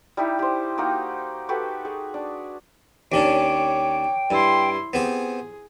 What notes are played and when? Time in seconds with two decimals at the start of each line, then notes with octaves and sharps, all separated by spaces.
0.17 G3 D#4 E4 G4
0.39 G4 C5
0.78 A#3 D#4 F#4 G4
1.49 F#4 G4 A4 B4
1.85 G#4
2.14 D4
3.12 D#2 C#4 D4 C#5 G5 D6
4.30 G2 E4 C6
4.93 B3 C4 G4 G#4